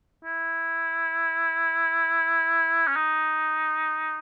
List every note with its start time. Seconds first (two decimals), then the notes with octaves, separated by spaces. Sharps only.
0.25 E4
2.87 C#4
2.96 D#4